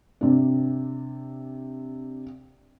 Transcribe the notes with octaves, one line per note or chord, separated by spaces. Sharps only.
C3 D4